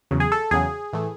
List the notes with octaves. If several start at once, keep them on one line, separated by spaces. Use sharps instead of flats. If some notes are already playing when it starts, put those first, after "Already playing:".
E2 C#3 F#3
G#4
A4
E2 C#3 F#3 G#4
A2 E3 A3